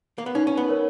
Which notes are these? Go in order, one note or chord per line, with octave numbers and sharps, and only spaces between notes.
A#3
B3
C#4 D#4
C#4
B3
A#4 C#5